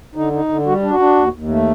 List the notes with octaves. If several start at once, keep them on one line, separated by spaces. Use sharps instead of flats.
D3 D#4
D#4
D3
G3 F#4
D4
F#4
D4
D#2
D#2
A3